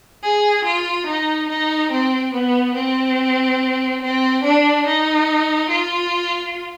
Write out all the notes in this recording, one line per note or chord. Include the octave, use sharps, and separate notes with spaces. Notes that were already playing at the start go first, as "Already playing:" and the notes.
G#4
F4
D#4
D#4
C4
B3
C4
C4
D4
D#4
F4